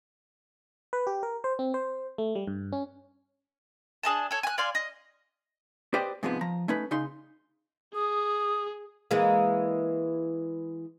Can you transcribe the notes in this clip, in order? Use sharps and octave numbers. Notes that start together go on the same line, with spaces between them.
B4
G4
A#4
C5
C4
C5
A3
G3
G2
C#4
D4 G#4 D#5 A5
A4 C#5
G#5 F#6
D5 F5 G#5 C6
D#5
G4 B4 C5 D5 D#5 G5
G#2 C3 F3 G#3 B3
F3 A#5
A3 C#4 D#4 B4
C#3 D#4 C6
G#4 D#6
E3 G#3 A#3